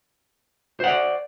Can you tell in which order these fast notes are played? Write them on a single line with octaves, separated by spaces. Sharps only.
C5 F#5 D5